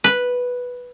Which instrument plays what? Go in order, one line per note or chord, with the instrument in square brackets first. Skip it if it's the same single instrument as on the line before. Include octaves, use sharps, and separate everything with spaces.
[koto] B4